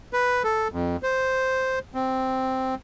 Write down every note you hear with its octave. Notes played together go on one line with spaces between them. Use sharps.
B4
A4
F2
C5
C4